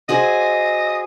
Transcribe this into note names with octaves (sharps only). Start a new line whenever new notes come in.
F#4 G#4 C5 D#5